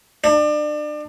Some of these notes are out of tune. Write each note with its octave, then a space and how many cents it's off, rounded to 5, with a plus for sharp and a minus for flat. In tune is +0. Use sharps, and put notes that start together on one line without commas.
D4 +30